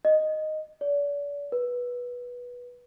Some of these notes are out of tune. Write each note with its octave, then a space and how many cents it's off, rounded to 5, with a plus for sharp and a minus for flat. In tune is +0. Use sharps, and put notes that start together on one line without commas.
D#5 -5
D5 -40
B4 -15